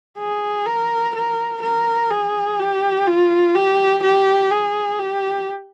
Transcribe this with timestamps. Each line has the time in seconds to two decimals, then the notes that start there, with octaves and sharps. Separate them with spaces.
0.18 G#4
0.66 A#4
1.15 A#4
1.62 A#4
2.10 G#4
2.59 G4
3.07 F4
3.54 G4
4.03 G4
4.51 G#4
4.99 G4